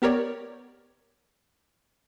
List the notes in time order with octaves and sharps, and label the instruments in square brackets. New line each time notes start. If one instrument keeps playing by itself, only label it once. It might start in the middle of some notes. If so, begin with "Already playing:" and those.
[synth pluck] B3 G4 A#4 C#5 D5